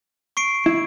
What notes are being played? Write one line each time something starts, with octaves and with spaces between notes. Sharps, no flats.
C#6 C7 D7
E4